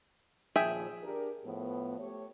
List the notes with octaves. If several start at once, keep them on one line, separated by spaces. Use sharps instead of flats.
D#2 A#2 F3 G#4 E5 G5
D4 G4 A#4
A2 F3 B3
A3 G4 C#5